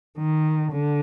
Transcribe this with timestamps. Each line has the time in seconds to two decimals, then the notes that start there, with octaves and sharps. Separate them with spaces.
0.18 D#3
0.72 D3